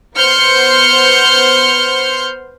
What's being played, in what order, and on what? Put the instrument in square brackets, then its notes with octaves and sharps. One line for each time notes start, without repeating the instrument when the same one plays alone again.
[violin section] B3 C5 C6 F6 G6 C#7